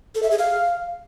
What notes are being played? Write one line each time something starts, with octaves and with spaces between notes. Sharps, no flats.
A4
E5
G#4
F5